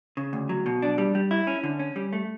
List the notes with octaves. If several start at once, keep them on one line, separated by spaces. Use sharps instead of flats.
C#3
D2
F#3
B2
D4
G3
G3
E4
C#4
D3
C#4
G3
A3